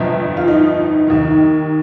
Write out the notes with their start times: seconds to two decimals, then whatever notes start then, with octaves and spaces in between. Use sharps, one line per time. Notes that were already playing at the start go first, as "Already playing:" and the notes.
Already playing: G1 F2 F3
0.37 F4
0.48 D#4
1.07 D#2 D#3